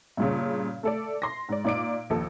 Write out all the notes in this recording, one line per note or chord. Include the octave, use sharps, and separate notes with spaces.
G2 A#2 C#3
A3 A4 D5
C6 A#6
G#2 D5
A#2 D#4 D5 D6 D7
A#1 D#2 A4